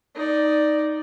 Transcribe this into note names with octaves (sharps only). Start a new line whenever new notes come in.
D#4 D5